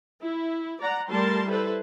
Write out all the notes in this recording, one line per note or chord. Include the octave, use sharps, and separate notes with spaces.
E4
D5 F#5 A#5
G3 A3 A#4 A5 C6
E4 A4 B4 C5